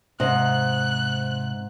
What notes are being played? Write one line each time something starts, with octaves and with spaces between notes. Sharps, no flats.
G#2 C3 D#5 F#6